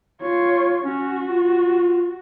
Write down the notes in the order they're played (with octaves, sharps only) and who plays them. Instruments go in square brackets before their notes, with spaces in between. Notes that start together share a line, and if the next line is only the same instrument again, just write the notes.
[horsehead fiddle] F4 C#5
[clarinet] C#4 [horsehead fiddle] F#4
[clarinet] F4